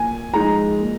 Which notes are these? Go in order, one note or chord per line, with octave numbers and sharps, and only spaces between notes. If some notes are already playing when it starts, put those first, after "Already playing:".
Already playing: A#2 G#5
F3 G#3 D#4 A#5
A#2